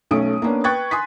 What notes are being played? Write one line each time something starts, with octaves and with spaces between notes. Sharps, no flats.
B1 A3 C#4 D#6 D7
A#3 B3 C#4 D4
B4 G5 C#6 F#6 G#6 A6
G#5 C6 D#6 B6